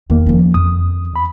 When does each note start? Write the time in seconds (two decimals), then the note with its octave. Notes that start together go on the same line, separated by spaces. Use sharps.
0.10 E2 D#3 A#3
0.27 F3 C#4
0.54 F2 D#6
1.14 E2 B5